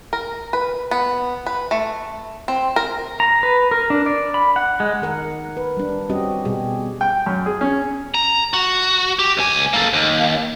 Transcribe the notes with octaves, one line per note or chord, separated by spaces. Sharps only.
A#4
B4
B3
B4
A3
C4
A#4
A#5
B4
A#4
D4
D5
B5
F#5
G#3
D#3 A#4 F#5
B4
G3 D4
G3 C4 C#4 F#4 G4 D#5
B2 G3 G4 G#4
G5
F#2
G#4
C#4
A#5
F#4
G4
C#2 G#5
A#3 A4
D#2